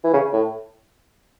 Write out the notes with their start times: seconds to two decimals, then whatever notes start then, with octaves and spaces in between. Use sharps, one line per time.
0.04 E3
0.13 C#3
0.33 A2